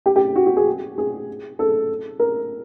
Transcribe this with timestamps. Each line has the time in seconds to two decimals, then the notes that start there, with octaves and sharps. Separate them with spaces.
0.06 G4
0.16 G4
0.36 F#4
0.46 F#4
0.56 G#4
0.98 G#4
1.59 A4
2.19 A#4